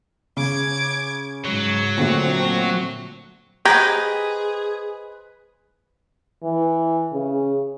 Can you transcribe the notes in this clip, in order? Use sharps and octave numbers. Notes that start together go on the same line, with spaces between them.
C#3 D6 G#6
G#2 F#3
A#2 D3 A3 C4 F#4
G4 G#4 B4 C5 D#5 A#5 G#6 A#6
E3
C#3